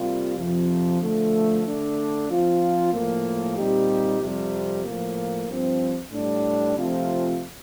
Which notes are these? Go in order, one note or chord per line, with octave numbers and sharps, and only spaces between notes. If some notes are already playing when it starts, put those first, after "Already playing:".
Already playing: C3 G3 A#3 F4
F2 C3 F3
D3 F3 A3
D3 A3 D4
F3 C4 F4
A2 F3 A#3
A#2 G3 C4 D#4 G4
F2 C3 G3
A2 F3 A#3
G2 F3 C4
A2 G3 D4
C3 F3 A3 C4 F4